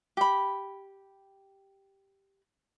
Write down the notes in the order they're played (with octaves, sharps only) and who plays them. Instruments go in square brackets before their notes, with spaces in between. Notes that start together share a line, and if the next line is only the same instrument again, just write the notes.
[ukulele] G4 B5